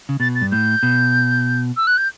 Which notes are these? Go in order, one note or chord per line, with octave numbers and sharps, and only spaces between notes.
C#3
B2 A6
A6
G2
A2 G6
B2
E6
F#6
G6